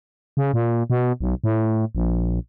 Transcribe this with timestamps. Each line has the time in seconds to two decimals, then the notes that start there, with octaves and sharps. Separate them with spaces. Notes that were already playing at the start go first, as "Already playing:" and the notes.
0.37 C#3
0.54 A#2
0.90 B2
1.21 B1
1.44 A2
1.95 A#1